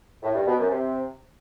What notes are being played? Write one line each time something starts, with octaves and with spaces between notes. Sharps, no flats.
A2
G2
B2
F#2
C3